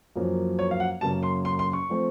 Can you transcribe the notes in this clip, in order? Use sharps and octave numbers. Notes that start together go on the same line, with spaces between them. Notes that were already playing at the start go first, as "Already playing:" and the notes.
F#2 F3 A#3 C#4
C#5
F5
F#5
F#2 C#3 F#3 A#3 C#4 A5
C6
C6
C6
C#6
F3 A3 C4